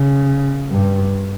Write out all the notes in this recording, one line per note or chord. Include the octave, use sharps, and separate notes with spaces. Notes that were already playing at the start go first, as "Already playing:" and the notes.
Already playing: C#3
G2